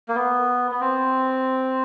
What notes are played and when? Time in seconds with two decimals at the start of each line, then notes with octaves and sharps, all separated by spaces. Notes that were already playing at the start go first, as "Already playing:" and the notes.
0.08 A#3
0.15 B3
0.71 B3
0.81 C4